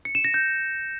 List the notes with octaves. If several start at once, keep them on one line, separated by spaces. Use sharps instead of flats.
C#7
E7
A#6
G6